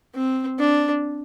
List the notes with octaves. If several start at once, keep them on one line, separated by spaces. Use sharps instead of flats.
C4
D4